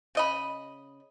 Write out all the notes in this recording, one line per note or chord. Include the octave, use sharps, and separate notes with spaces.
C#3 D#5 B5